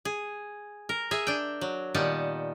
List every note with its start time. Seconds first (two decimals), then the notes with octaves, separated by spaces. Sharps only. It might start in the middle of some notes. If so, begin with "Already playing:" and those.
0.05 G#4
0.89 A#4
1.11 G#4 E5
1.27 D4 G5
1.61 F#3
1.94 A#2 D#3 G3 B3 A5